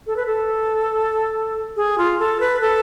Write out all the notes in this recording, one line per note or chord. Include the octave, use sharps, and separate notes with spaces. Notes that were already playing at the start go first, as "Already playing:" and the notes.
A4
B4
A4
G#4
F4
A4
B4
A4